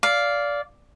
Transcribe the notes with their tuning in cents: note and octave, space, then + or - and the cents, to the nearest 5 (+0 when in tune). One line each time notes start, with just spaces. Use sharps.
D5 -15 F5 +0